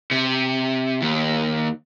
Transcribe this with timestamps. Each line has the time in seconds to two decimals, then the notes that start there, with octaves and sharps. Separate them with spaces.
0.11 C3
1.02 D#2